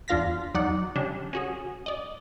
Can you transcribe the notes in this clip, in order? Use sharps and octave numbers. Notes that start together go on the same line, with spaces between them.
E2 D4 F4 F5 A#6 B6
E2 F#3 D#4 D5 F#5 F#6
C#3 G3 C#4 D4
C#4 F#4 G#4
D5 D#5